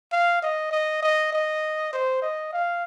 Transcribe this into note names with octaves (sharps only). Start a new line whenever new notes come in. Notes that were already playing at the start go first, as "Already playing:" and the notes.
F5
D#5
D#5
D#5
D#5
C5
D#5
F5